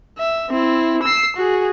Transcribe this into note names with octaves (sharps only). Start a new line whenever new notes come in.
E5
C4 E4
E6 C7
F#4 G#4